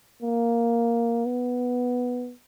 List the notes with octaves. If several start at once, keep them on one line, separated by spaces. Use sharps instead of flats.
A#3
B3